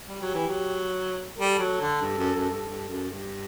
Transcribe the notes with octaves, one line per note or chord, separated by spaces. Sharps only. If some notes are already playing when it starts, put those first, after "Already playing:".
G3 G4
F#3
E3
F#3
G3 A4
F#3
D3
G2
F#2
F#2
G2
G2
F#2
G2